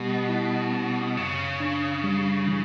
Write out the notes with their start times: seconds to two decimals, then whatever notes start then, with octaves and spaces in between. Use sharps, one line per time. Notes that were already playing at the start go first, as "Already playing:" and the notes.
Already playing: B2 G3 G4
0.29 E4
0.73 C#4
1.17 F#2 C#3
1.60 D4
2.04 G3
2.47 E3